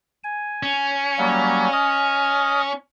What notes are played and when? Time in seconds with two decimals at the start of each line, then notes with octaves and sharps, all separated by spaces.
0.24 G#5
0.63 C#4
1.18 F#3 G3 A#3
1.73 D#5 D#6 F6